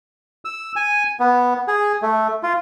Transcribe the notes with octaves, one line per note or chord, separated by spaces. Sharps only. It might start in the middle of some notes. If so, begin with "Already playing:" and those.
E6
G#5
B3
G#4
A3
F4